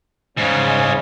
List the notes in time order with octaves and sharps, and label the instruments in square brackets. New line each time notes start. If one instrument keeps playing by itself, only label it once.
[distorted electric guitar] E2 G3 [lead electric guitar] G#2 [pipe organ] C#3